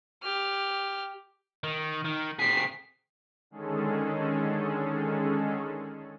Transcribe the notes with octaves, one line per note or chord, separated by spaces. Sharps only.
G4 F6
D#3
D#3
C4 G#4 B6 C7
D3 D#3 G#3 C#4 G#4 A4